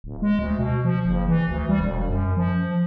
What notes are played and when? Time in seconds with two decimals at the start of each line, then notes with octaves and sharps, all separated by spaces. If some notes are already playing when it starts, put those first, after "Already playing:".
0.04 D1
0.22 G#3
0.39 D2
0.59 B2
0.85 F3
1.05 F#1
1.28 E3
1.49 D2
1.69 G3
1.80 E1
2.09 F#2
2.37 F3